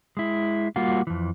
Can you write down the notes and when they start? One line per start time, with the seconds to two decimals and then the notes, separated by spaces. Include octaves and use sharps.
0.17 G#3 E4
0.76 G3 A#3 F4 F#4
1.07 F2 E3